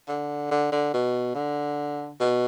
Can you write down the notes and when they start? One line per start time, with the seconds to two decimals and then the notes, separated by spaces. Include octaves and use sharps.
0.08 D3
0.51 D3
0.72 D3
0.94 B2
1.35 D3
2.20 B2